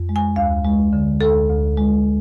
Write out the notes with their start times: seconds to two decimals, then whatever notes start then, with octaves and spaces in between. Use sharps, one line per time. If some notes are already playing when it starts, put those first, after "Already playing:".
Already playing: F2
0.09 G#3
0.16 G#5
0.36 D2 F5
0.65 G#3
0.93 D3
1.21 D2 A4
1.50 D2
1.77 G#3